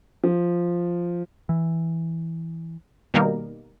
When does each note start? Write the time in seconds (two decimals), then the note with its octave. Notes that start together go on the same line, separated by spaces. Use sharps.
0.24 F3
1.49 E3
3.14 B2 D#3 G3 A#3 D#4 A#4